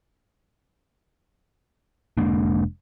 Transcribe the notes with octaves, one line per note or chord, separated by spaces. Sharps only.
F1 G#3 A#3 D4